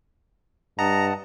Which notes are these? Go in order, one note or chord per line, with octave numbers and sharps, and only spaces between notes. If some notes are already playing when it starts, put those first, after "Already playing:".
G2 D#5 F#5 A5 A#5